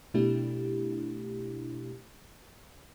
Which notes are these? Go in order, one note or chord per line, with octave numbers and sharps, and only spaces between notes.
B2 A3 D4 E4 G4